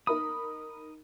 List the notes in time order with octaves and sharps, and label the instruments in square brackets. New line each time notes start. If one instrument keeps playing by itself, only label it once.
[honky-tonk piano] D#4 A#4 B5 [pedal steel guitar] D#6